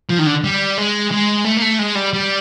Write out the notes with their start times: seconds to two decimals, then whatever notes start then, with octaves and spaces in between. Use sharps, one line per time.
0.09 F3
0.18 D#3
0.26 D3
0.44 G3
0.78 G#3
1.11 G#3
1.45 A3
1.57 A#3
1.62 A3
1.79 G#3
1.95 G3
2.13 G3